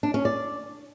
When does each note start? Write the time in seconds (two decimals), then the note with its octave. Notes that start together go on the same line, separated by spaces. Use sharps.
0.03 D4
0.14 C#4
0.25 D5